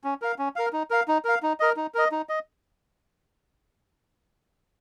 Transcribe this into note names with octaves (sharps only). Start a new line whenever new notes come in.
C#4
A#4 F5
C#4
A#4 F5
D#4
A#4 F5
D#4
A#4 F5
D#4
A#4 D#5
D#4
A#4 D#5
D#4
D#5